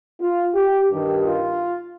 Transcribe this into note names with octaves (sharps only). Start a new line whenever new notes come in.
F4
G4
G2 D#3 G4
F4